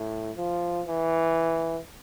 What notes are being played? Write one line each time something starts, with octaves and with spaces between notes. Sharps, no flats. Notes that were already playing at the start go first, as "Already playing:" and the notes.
Already playing: A2
F3
E3